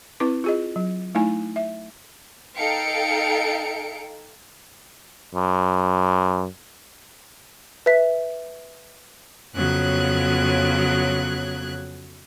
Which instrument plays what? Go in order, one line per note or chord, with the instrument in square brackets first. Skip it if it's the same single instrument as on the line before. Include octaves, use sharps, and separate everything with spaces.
[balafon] C4 E4 B4 D6
F4 G#4 D#5
F#3
A3 D#4 E4 G#5
E5
[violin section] D#4 A4 F5 G5 C#7 D7
[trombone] F#2
[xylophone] B4 E5 B6
[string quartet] F2 C#3 F#3 B3 F#6 G#6